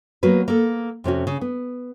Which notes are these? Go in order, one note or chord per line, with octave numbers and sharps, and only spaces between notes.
F#3 A#3 B3 F#4 B4
A#3 A4
F2 C3 C#4 F#4
C#3
B3